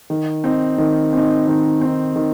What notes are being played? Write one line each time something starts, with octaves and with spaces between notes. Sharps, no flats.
D#3
C4 D#4
D#3
C4 D#4
D#3
C4 D#4
D#3